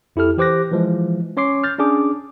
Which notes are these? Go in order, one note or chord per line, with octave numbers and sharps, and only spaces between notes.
F2 E4 G4 A4 F6
E3 G4 C5 D6 F#6 A#6
E3 F3 G#3
C#4 C#5 C6 D6 C7
F6 G6 A6
C#4 D4 G#4 D6